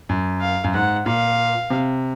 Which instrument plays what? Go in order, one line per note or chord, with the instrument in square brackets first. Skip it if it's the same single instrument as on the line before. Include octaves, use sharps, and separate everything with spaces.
[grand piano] F#2
[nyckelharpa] F5
[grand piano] F#2
[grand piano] G#2 [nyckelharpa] F#5
[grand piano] A#2 [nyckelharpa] F5
[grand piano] C3